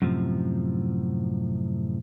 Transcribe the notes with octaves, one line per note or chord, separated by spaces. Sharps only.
F#2 A2 C3 F3